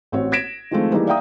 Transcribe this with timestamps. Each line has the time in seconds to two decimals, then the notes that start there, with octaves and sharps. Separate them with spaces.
0.12 A1 C4 F#4 C#5
0.32 G#6 A#6 B6 D7 E7
0.71 D#3 F3 G#3 A3 C4
0.92 E3 G3 A#3 D#4 G#4
1.07 D5 E5 F5 G5 A#5 D#6